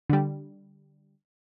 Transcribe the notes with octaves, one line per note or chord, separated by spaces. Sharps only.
D3 G3